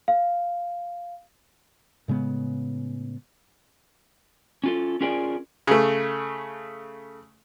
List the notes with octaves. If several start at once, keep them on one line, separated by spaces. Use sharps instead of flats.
F5
A2 C#3 G#3 B3
C#4 F4 A4
C#4 F4 G#4 A#4 D5
C#3 A3